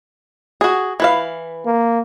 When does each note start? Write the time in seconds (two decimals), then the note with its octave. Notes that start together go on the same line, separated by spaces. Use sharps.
0.61 F#4 G#4
1.00 E3 B4 F5
1.66 A#3